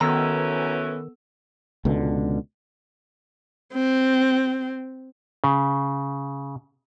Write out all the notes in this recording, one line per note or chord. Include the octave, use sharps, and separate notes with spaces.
B2 D#3 E3 B3 C#4 A4 A#5 E6
C#2 B2 D3
C4
C#3